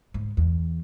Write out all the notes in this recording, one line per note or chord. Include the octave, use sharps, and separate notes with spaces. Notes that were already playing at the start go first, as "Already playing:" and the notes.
G#2
E2